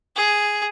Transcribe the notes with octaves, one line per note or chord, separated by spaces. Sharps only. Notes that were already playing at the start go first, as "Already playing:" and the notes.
G#4